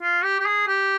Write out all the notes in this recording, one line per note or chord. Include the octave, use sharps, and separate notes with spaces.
F4
G4
G4
G#4
G4